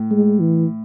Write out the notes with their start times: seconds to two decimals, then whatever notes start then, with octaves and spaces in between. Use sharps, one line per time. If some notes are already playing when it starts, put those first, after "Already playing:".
Already playing: A2
0.11 G#3
0.40 E3